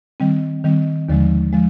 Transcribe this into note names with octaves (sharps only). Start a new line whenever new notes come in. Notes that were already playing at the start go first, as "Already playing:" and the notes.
D#3 G3 C4
D#3 G3 C4
D#2 D3 F3 G#3
F3 G#3